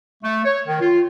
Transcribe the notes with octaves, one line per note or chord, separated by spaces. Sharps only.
A3
C#5
D#3
F4